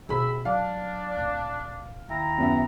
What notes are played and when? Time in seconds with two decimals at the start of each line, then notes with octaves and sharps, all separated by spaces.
0.09 C2 B2 D4 G#4 E5 B5
0.45 F#3 D4 F5
1.17 D1 A#1
2.09 D#2 E4 G5 A#5
2.38 F#2 B3 E5